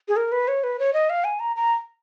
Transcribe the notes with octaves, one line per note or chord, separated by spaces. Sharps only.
G#4
A#4
B4
C#5
B4
C#5
D#5
F5
G#5
A#5
A#5